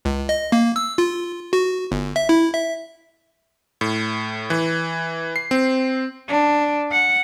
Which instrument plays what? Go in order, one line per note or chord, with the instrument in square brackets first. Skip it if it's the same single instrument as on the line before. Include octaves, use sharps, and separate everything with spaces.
[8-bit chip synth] C#2
D#5
A#3
E6
F4
F#4
G1
E5
E4
E5
[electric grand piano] A2
E3
C7
C4
[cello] D4
F#5